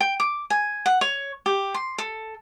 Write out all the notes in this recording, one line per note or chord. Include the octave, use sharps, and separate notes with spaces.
G5
D6
G#5
F#5
C#5
G4
C6
A4